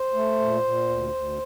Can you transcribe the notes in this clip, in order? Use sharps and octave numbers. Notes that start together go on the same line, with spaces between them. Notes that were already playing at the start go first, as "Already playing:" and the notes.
Already playing: C5
A3
A#2
A#2
D2
D2